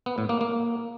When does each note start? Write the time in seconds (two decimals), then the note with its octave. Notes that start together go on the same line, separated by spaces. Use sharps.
0.06 B3
0.18 A2
0.29 A#3
0.41 A#3